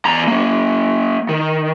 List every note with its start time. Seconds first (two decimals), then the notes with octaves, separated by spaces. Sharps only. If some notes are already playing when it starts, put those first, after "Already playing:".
0.05 E2 A#5
0.28 F#3 A#3
1.29 D#3